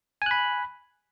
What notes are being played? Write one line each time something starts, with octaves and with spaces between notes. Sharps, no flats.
G#5 B5 F#6